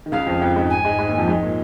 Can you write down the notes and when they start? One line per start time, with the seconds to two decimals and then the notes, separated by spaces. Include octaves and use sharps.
0.06 D#3
0.12 C#2 C#3 F5
0.27 F2 F3
0.41 F2 F3
0.56 G#2 G#3
0.70 G#5
0.84 G#2 G#3
0.99 G#2 G#3
1.09 D#2 D#3
1.18 F2 F3
1.28 G#2 G#3
1.43 A#2